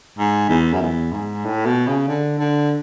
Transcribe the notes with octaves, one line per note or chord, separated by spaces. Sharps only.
G#2
E2
F#2
E2
G#2
A2
B2
C#3
D3
D3